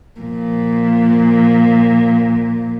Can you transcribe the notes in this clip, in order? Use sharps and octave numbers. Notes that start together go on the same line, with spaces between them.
A#2 F3